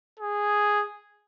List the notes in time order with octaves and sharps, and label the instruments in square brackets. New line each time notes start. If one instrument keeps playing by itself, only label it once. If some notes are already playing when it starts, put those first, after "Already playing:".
[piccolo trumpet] G#4